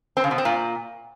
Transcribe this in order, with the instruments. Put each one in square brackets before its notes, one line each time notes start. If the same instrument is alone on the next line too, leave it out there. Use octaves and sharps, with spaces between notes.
[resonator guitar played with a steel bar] C4
C#3
B2
C4
A#2